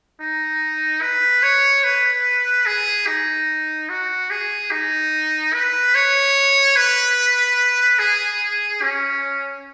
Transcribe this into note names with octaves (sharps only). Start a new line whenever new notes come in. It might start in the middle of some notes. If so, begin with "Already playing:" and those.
D#4
B4
C#5
B4
G#4
D#4
F#4
G#4
D#4
B4
C#5
B4
G#4
C#4